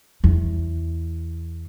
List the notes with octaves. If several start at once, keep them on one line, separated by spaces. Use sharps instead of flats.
E2